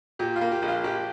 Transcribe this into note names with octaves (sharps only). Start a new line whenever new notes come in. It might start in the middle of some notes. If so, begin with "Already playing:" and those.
A#2 G4
F4
A#3
G4
A#1
F4
A#1 G4